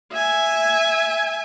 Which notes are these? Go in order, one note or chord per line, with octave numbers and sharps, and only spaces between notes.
E5 G#5